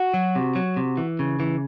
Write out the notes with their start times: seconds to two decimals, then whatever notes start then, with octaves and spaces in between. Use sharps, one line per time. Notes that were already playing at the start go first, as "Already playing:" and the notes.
Already playing: F#4
0.14 F#3
0.35 C3
0.55 F#3
0.76 C3
0.97 E3
1.19 C#3
1.40 E3